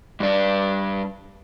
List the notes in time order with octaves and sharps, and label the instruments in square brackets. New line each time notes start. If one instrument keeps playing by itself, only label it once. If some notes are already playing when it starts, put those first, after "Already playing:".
[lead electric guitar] G2 D4